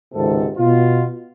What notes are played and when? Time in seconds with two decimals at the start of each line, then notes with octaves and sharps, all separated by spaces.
0.14 G#1 C#2 G#2 C3 A4
0.57 B2 F4